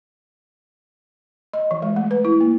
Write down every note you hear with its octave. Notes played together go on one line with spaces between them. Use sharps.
D#5
E3
G#3
A3
B4
E4
A#3